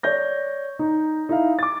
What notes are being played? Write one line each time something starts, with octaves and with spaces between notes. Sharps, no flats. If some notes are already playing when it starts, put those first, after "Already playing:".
C#5 D5 G6 A#6
D#4
D#4 E4 F5
D6 A6